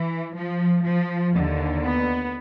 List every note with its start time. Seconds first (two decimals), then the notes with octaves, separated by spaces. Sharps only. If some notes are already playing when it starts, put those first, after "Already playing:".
Already playing: E3
0.35 F3
0.85 F3
1.34 D#2 D3
1.84 B3